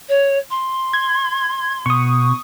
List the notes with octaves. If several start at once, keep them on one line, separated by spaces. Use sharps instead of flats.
C#5
C6
G#6
B2 C#6 D#6